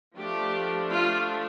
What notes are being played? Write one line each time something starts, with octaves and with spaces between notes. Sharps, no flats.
F3 A3 D4 G4
F4